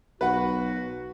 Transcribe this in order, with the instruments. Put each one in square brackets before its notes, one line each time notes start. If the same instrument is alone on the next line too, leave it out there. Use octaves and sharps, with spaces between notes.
[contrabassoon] B1 [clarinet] F#4 [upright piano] B4 F#5